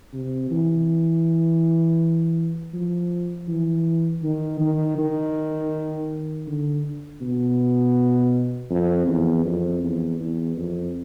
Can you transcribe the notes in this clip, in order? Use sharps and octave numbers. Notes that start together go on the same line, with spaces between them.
C3
E3
F3
E3
D#3
D#3
D#3
D3
B2
F2
E2
F2
E2
E2
F2